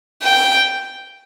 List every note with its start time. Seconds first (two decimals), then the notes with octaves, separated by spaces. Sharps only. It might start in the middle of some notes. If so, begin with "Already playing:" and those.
0.23 G5